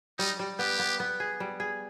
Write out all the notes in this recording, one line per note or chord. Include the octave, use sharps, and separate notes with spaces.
G3 D#4
G3
B3 G4
B3
B3
G#4
G3
G#4